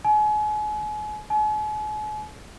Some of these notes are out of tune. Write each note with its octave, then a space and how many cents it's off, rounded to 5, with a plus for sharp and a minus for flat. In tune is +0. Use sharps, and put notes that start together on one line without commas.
G#5 +35
G#5 +45